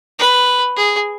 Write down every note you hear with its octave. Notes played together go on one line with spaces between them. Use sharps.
B4
G#4